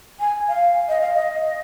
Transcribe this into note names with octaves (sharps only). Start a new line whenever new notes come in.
G#5
F5
D#5
F5
D#5